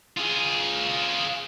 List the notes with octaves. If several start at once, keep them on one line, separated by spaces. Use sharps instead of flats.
F4 G#4